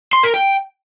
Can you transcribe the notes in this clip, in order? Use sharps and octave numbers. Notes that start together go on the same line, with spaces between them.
C6
A#4
G5